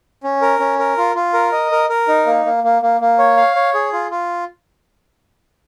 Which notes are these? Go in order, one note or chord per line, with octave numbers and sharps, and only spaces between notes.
C#4
A#4
C#4
A#4
F4
F4
A#4
D#5
A#4
A#4
D#4
A#3
A#3
A#3
A#3
A#3
C#5
F5
C#5
G#4
F4
F4